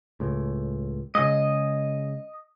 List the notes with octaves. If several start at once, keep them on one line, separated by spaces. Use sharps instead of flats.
C#2 A2
C#3 G#3 D#5